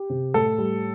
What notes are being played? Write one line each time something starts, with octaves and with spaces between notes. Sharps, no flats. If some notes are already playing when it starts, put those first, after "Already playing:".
Already playing: G4
C3
A2 A4
G3